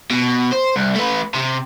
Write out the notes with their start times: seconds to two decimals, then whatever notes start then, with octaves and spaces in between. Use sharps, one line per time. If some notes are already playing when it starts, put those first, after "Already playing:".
0.10 B2
0.52 C5
0.76 C2
0.96 A3 B4
1.34 C3